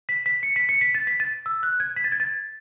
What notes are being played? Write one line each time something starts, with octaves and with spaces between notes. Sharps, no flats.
B6
B6
C#7
B6
C#7
B6
A6
B6
A6
E6
F#6
G#6
B6
A6
G#6
A6